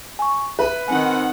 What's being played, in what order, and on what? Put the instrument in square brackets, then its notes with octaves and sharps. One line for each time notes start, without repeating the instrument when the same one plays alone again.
[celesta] G#5 C#6
[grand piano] B4 B5 [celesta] E5
[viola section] D#3 C4 F#5 [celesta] G#5